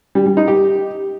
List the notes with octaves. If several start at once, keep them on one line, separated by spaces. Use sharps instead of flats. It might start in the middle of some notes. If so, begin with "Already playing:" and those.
G3
G3
D#4
G4